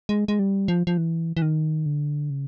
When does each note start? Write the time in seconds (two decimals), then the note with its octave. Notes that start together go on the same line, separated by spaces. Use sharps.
0.09 G#3
0.28 G#3
0.39 G3
0.68 F3
0.87 F3
0.98 E3
1.37 E3
1.42 D#3
1.86 D3
2.30 C#3